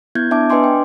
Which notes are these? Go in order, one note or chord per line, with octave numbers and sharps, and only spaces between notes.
B3 E4 G6 G#6
B3 D4 E5 A5 D6
D4 B4 D#5 G#5 C6 D6
G5